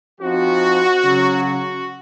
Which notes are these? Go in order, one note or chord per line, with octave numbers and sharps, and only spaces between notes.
F3 C4 D#4 F#4
C#3 F#3 C#4
F#4